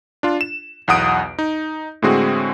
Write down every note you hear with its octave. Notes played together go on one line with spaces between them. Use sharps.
D4 F4
E7
B1 E2 F#5 D#6 D7
D#4
A2 D3 G#3 C4 F#4 G#4